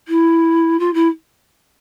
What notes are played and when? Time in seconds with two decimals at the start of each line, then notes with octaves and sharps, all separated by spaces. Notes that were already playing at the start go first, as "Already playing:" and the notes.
0.08 E4
0.79 F4
0.94 E4